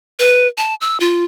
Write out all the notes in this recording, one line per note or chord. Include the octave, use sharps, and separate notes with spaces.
B4
A5
E6
F4